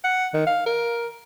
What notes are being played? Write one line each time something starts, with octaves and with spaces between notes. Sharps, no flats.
F#5
D#3
F5
A#4